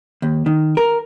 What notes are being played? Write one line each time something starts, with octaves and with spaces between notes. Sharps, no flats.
D#2
D#3
A#4